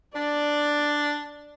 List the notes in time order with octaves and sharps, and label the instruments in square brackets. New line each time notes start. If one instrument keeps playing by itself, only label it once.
[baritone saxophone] D4 [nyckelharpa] D5